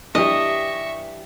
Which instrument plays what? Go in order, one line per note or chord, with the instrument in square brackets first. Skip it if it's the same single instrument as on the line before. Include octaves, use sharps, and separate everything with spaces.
[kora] G2 E3 [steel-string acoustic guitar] G4 A5 [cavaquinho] D#5 [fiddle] E5 C#6